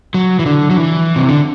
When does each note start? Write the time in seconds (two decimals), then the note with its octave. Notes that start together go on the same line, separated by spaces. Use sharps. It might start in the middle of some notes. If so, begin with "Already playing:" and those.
0.14 F#3
0.39 E3
0.46 D3
0.70 F#3
0.77 E3
1.16 C3
1.29 D3